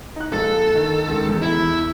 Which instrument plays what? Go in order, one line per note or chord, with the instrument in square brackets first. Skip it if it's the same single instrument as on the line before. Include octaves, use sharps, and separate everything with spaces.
[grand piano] D#4 F#6
[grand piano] A#1 F4 A6 [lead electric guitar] A4
[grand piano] D#3
C#2 D#3
E2
[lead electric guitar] E4